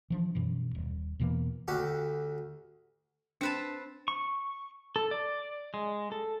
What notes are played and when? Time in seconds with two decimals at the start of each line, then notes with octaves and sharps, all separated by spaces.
0.10 E3 F3 D4
0.35 F#2 B2 E3
0.75 D#1
1.20 E2 B2 E3 A#3
1.68 D2 F#4 G4
3.41 C4 D4 B4 A5
4.08 C#6
4.96 A4
5.11 D5
5.74 G#3
6.12 A4